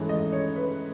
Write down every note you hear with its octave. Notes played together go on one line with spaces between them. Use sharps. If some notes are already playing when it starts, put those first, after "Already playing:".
Already playing: G#2 E3 A3 C#4
D#5
C#5
B4